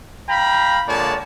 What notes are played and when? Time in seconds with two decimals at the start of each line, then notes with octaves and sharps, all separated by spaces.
0.29 F5 G5 A#5 B5
0.87 A#2 D3 G#3 C#5 D5 A5